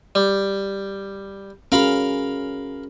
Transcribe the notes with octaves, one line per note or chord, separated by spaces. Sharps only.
G3
C#4 F#4 G#4 A#4 F5 B5